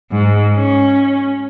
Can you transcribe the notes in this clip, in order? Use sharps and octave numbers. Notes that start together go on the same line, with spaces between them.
G#2
C#4